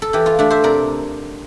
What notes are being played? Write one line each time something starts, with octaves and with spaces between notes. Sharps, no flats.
A4
E3 G4
F4
A3 D4
C5 E5
C3 A#4 D5